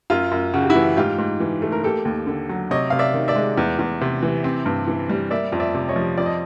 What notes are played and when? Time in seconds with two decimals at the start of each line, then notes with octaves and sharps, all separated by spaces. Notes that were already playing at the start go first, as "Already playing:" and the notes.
0.10 F#2 F4
0.31 F#2
0.54 C#3 F#4
0.62 G4
0.70 E4 F#4
0.75 E3
0.97 G#2 F4 G4
1.18 G#2
1.40 E3
1.62 A3
1.72 A#4
1.83 A#3 G4 A4
2.05 D#2
2.27 D3
2.49 F#3
2.71 C3 C#5 D#5
2.90 C3 F5
2.99 D5 E5
3.14 D#3
3.28 D5 E5
3.36 G#3
3.58 E2
3.79 E2
4.01 C3
4.23 E3
4.44 C4
4.66 G2
4.87 E3
5.09 G3
5.31 A#3 D5 E5
5.52 F2
5.60 D5 E5
5.74 C3
5.89 C#5 D#5
5.96 F3
6.17 F2 D5
6.26 D#5